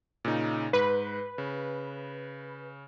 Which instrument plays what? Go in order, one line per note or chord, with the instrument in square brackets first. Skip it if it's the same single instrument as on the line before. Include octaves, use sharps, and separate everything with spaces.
[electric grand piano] A#2 C#3 D#4
[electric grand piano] G#2 [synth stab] B4
[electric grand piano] C#3